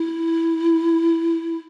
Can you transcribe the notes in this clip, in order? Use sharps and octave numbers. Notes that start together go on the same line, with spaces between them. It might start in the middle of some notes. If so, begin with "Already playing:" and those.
Already playing: E4